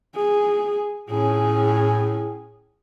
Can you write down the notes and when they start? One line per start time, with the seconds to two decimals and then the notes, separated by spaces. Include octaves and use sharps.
0.15 G#4
1.10 A2 C#4 G#4